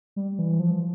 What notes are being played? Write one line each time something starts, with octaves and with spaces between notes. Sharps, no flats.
G3
E3
F3